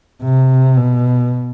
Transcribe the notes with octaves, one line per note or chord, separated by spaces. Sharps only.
C3
B2